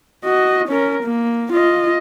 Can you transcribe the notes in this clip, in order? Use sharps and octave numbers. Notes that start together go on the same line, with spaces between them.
F#4 D#5
C#4 A#4
A#3
F4 D#5